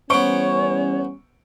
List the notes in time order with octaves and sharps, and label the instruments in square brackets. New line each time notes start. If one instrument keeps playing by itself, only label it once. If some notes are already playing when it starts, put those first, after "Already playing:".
[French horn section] E3 G3 C#4 [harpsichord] B3 C5 [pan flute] C#5 [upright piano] C#6 D7